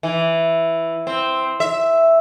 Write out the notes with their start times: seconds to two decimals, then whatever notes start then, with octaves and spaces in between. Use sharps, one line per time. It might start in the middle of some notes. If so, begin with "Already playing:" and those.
0.03 E3
1.07 C4
1.60 E5